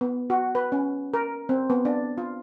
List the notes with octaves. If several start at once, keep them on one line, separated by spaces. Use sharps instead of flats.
B3
F#4
B4
C#4
A#4
C4
B3
D4
F4